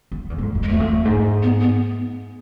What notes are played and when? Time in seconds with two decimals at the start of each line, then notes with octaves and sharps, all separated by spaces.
0.12 F2
0.30 E2
0.38 G#2
0.43 F2
0.55 F2
0.63 G#3
0.68 E2 A3
0.80 F2
0.92 F2
1.05 G#2
1.43 B3
1.61 B3